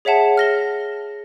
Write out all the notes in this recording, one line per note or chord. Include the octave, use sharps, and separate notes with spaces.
G#4 C#5 E5 F#5 A5
F6 A#6 G7